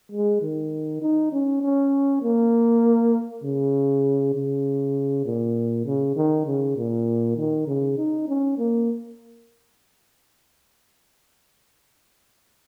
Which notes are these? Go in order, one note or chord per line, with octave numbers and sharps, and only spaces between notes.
G#3
D#3
D#4
C#4
C#4
A#3
C#3
C#3
A#2
C#3
D#3
C#3
A#2
D#3
C#3
D#4
C#4
A#3